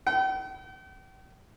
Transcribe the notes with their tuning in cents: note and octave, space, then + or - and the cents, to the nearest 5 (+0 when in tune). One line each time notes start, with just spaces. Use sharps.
G5 -40